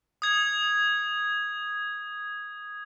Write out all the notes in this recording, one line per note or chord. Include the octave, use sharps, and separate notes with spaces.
D#6 G#6